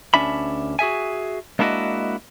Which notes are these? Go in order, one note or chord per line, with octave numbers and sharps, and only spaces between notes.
D2 C#4 D4 E5 B5
F#4 G#4 E5 G#5
G#3 A#3 D4 E4 F#4 D#5